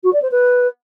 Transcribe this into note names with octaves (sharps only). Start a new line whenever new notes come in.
F#4
D5
C5
B4